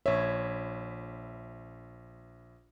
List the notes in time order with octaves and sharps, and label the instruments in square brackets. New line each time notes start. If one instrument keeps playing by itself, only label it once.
[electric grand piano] A#1 E5 [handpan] C#5